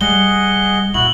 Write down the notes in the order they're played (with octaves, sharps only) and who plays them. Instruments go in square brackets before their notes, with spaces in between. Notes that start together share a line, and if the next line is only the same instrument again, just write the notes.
[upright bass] G3 [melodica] G#4 D#5 F#5 [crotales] G7
[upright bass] A#2 [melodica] E4 F#4 [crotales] F#7